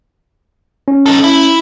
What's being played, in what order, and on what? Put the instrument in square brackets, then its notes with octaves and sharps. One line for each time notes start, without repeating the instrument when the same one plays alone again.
[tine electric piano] C#4
[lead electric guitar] D#4 A4
E4